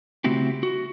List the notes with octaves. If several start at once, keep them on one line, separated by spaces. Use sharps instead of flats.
C#3 A3 C4 E4 F#4 G4
F#4